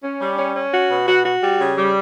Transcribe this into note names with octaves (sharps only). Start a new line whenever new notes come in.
C#4
G3
C#4
C#4
F#4
B2
F#4
F#4
G3
C#3
G3